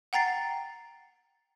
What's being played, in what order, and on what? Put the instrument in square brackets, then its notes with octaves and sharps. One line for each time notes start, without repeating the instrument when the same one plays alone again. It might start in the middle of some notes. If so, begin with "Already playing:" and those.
[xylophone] F#5 G5 A#5 A6 C7